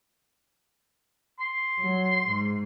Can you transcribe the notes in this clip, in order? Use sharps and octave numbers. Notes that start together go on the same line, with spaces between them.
C6
F#3
G#2